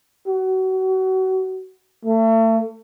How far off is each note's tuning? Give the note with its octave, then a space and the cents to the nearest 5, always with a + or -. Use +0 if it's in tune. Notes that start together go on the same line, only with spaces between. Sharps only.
F#4 +30
A3 +35